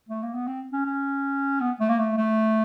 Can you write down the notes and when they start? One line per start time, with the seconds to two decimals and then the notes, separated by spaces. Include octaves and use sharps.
0.09 A3
0.23 A#3
0.35 B3
0.48 C4
0.73 C#4
0.86 C#4
1.61 B3
1.80 A3
1.89 A#3
1.99 A3
2.18 A3